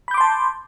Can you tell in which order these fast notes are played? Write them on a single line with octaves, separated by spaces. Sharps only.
B5 G6 D6 C6 A5